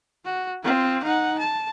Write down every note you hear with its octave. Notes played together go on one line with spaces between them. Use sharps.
F#4
C4 F4
D#4 F#5
A5